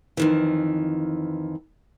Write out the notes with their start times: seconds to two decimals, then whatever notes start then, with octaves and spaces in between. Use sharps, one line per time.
0.17 F2 D#3 E3